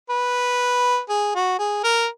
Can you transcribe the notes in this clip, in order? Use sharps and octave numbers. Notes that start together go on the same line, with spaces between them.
B4
G#4
F#4
G#4
A#4